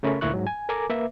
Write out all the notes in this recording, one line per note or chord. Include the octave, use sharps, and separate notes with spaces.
C#3 A3 C#4 A#4 B5 C#6
D2 A#2 A#3 E4 C#6 F#6
G#2 F#3
G#5
A4 A#4 G#5 A#5 D6
A#3 B4 E5